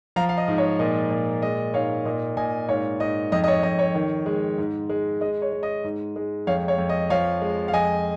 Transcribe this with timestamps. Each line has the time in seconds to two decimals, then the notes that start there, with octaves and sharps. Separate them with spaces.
0.16 F3 F5 A#5
0.29 F5
0.37 D#5
0.48 G#2
0.58 C#5
0.79 A#2 D#5
1.11 A#2
1.42 G#3 D#5
1.74 G#2 C#5 F5
2.05 A#2 D#5
2.37 A#2 D#5 G#5
2.69 G#2 C#5 F5
3.00 G#2 D#5
3.32 F2 D#5
3.44 D#5
3.48 C#5
3.63 F2 D#5
3.79 C#5
3.95 D#3
4.26 G#3
4.58 G#2
4.89 G#3
5.21 G#3 D#5
5.42 C#5
5.52 G#3
5.63 D#5
5.84 G#2
6.16 G#3
6.47 F2 C#5 F5
6.68 C#5 F5
6.78 F2
6.89 D#5
7.10 F3 C#5 F5
7.42 G#3
7.68 F5
7.73 F2 D#5 G#5